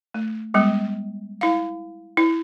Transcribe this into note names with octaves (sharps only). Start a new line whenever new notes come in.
A3
G3 G#3 B3
E4 F5
E4